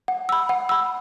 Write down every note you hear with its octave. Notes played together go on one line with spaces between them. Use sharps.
F#5
B5 E6
F#5
B5 E6